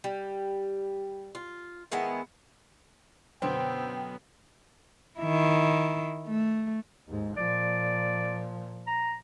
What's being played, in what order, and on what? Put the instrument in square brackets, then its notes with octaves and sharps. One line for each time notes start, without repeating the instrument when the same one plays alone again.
[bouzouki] G3
F4
D#3 G#3 B3 E4
[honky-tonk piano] F#2 B2 D3 [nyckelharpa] B3 [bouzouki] C4 [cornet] G5
[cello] D#3 E4
A3
[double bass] D#2 G#2
[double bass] A#2 F3 [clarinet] D5
[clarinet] A#5